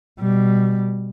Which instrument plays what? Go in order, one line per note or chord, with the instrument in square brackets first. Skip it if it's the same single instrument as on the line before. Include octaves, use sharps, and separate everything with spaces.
[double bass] B2 G3